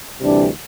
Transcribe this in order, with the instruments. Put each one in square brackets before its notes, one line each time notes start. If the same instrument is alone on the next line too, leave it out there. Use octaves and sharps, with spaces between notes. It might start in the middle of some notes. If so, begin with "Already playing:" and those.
[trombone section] D2 C3 E3 G3 D4